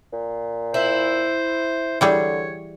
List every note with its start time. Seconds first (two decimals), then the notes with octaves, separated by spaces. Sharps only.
0.13 A#2
0.74 E4 C5
2.01 D3 E3 G3 G#4 C#5